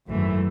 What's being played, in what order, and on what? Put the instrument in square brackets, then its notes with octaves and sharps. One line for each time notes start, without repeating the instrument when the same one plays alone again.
[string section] G#1 F#2 E3 A3